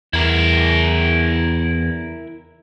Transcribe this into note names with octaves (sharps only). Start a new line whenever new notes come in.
E2 E4 A#4